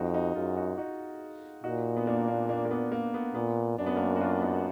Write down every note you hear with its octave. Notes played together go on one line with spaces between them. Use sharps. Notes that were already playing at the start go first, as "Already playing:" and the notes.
Already playing: F2 D#4 F#4
D#4 F#4
F#2 F4 G#4
D#4 F#4
D#4 F#4
A#2 D#4 F#4
B3
A#3 D4
A#3 D4
A#3 D4
A#3
B3
A#3
B3
A#2 B3
F#2 D4
B3
A#3 D4
F#4
D4 F4
B3 D#4